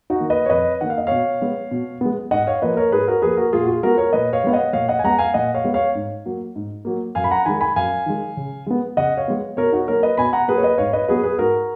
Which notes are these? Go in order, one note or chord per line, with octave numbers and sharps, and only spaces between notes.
D#4 F#4
D#3 A#3
B4 D#5
C#5
F2 B4 D#5
D#3 A#3 F#5
F5
D#5
B2 C#5 F5
G#3 B3
B2
G#3 B3
G#2 D#5 F#5
C#5 F5
F3 A#3 B4 D#5
A#4 C#5
G#2 G#4 B4
F#4 A#4
F3 A#3 G#4 B4
F#4 A#4
A#2 F4 G#4
F#4
F4 G#4
G#3 B3 F#4 A#4
A#4 C#5
A#2 B4 D#5
C#5 F5
G#3 B3 F5
D#5 F#5
A#2 C#5 F5
D#5 F#5
G#5
G#3 B3 F#5 A#5
F5 G#5
A#2 D#5 F#5
C#5 F5
G#3 B3
C#5 F5
G#2
F#3 A#3
G#2
F#3 A#3
F#2 F5 G#5
B5
F#5 A#5
D#3 G#3 G#5 B5
G#5 B5
F#2 F5 G#5
D#3 G#3
C#3
G#3 B3
C#3 D#5 F#5
C#5 F5
G#3 B3
B2 A#4 C#5
D#4 F#4
F#3 A#3 A#4 C#5
B4 D#5
B2 G#5 B5
F#5 A#5
F#3 A#3 G#4 B4
C#5
B4 D#5
G#2 C#5 F5
B4 D#5
F#3 B3 G#4 B4
G#4 B4
G#2 F#4 A#4